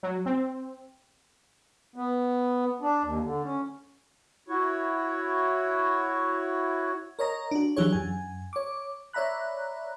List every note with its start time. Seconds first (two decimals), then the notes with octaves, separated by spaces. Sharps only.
0.03 F#3
0.26 C4
1.96 B3
2.81 D4
3.03 D#2
3.24 D3
3.44 C#4
4.49 E4 F#4 C#5
7.19 A#4 C#5 D#5 A#5
7.51 D4 F#4
7.77 E3 F#3 D4 G4 G#4 C#5
7.93 F#2 G#5
8.53 C#5 D6
9.13 C#5 D5 E5 A#5 B5 F#6